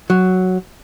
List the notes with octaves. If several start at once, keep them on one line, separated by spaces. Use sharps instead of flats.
F#3